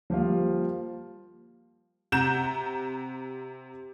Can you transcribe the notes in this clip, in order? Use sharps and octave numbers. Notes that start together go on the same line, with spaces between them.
F3 G3 A#3 F4
C3 F#5 A#5 G6 E7